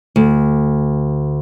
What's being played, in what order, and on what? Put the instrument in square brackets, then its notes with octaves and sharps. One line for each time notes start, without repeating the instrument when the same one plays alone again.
[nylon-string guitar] D2